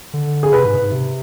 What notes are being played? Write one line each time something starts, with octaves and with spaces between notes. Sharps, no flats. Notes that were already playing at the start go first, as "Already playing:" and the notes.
D3
G#4
C3 B4
G#2
G#2
C3